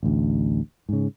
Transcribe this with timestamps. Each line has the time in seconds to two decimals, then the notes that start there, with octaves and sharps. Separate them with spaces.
0.03 A1 D2
0.89 G#2 C#3